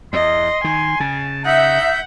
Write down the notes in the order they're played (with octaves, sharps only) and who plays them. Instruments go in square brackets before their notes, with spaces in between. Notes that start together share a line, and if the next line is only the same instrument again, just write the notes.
[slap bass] E2 [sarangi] D#5 [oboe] C6
[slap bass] D#3 [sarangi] G#5
[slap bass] C#3 [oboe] A5
[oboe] D#4 [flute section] E5 G6 [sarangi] F#5